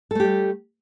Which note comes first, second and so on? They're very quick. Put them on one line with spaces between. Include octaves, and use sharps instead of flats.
A4 A3 G4 G3